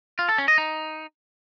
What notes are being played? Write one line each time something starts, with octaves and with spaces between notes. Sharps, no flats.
F4
A4
C#4
D#5
D#4